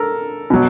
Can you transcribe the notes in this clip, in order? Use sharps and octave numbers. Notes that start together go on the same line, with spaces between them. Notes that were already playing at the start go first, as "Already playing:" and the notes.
Already playing: A4 A#4
B2 F#3